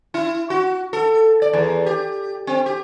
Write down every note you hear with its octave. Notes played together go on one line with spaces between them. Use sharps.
E4
F#4
A4
D5
E2
G4
C4
G4